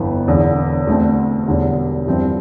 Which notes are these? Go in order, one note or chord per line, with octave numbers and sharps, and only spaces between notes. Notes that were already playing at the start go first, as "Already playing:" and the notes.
Already playing: G1 F2 E3 B3
E1 E2 D3
D2 D3 A3 C4
E1 E2 D3 G3
G2 F3 C4 E4